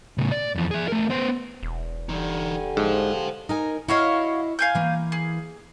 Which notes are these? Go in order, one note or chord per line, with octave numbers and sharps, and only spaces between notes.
A2 C#3
D5
F2 E3
G#4 E5
A3 A#4
B3 C5
E1
D3 E3 G3 D#4 G#5
G#2 C5 F5
D#4 A#4 G#5
E4 F#4 C#5 D#5 F5
F5 G#5 G6
E3 A#3
G#4